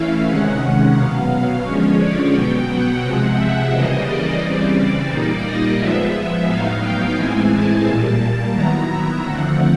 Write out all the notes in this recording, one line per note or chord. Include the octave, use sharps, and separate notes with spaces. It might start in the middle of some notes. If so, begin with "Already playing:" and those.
Already playing: E3 A3 C#4 E4 E5 F5
C3 D#3 G#3 C#4 F#5
B2 F#3 B3 F5
F5
D3 F3 G#3 C#4 C#5
D5
B2 F#3 B3 G5
F#5
C3 F3 G#3 C4
E5
C#3 E3 G3 A#3 D#5
D5
C#3 E3 G3 C4 D5
D5
A#2 G3 A#3 D#4 D5
D#5
F3 G#3 B3 E5
A2 F#3 B3 D#4 F5
G5
A2 E3 G#3 C4 E4 G#5
A5
A#2 G3 A#3
D#3 F#3 B3 E4 A#5
E5
D3 F3 A3 C4 F#5